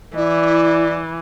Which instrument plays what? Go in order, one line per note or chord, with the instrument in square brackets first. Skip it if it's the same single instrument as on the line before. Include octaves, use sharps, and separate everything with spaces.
[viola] E3 [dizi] E4 [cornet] D5